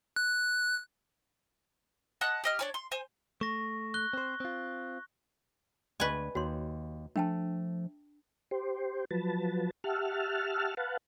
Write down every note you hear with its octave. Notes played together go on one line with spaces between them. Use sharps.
F#6
D#5 F#5 A5 F#6
G4 D#5 F6
D4 C#5 G#5
C6
C5 G#5
A3 C#6 A#6
F#6 G7
C4 C5
C4 F4
D2 B4 D5 D#5 G#5 C#6
D#2 F#4 C#5 C6
F3 A3 D4 G5 A5
G4 C5
F3 F#3 B4 A5
G4 E5 F#5 A5 F6
B4 F5 F#5 A5